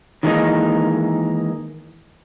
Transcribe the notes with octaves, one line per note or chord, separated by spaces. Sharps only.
D#3 E3 G#3 A#3 C#4 D#4